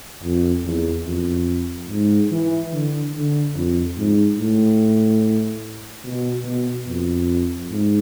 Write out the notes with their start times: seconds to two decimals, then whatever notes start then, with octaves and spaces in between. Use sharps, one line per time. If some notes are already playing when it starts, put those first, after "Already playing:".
0.23 F2
0.65 E2
1.07 F2
1.89 G#2
2.31 E3
2.73 D3
3.14 D3
3.55 F2
3.97 G#2
4.38 A2
6.05 B2
6.46 B2
6.87 F2
7.70 G#2